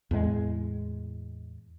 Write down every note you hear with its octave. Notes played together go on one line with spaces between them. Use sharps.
E2 A2 G#3